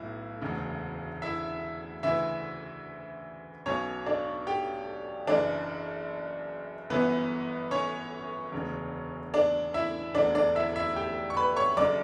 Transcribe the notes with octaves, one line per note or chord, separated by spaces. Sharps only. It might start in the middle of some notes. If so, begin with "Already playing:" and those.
Already playing: B1 A2 E4
E1 D2 C#3
E4 E5
D2 C#3 E3 E4 E5
B1 B2 C#4 C#5
D4 D5
G4 G5
F#1 F#2 E3 D4 D5
G1 F#2 E3 B3 B4
C#4 C#5
E1 D2 C#3
D4 D5
E4 E5
E1 D2 D3 D4 D5
D4 D5
E4 E5
E4 E5
G4 G5
C#6
B4 B5
C#5 C#6
F#1 F#2 D3 D5 D6